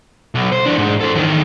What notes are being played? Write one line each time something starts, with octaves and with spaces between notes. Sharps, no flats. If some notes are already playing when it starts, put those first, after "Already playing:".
B1
C5
E3 D4
G#2
A4 C5
E2 D#3